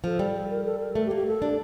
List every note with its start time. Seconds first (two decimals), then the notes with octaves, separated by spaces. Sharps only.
0.04 F3 A4
0.19 G3
0.34 A4
0.50 A#4
0.65 A4
0.80 A#4
0.95 A3 A4
1.06 G4
1.11 A#3
1.16 G4
1.27 A4
1.42 D4